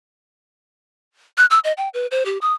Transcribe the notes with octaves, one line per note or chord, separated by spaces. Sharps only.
F#6
E6
D#5
G5
B4
C5
G4
D#6